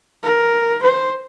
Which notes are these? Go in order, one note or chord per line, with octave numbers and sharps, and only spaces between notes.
A#4
C5